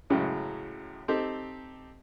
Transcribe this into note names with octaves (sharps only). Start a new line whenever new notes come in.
F#2 A2 C#3 F#3 G#3
C4 D#4 G4 A4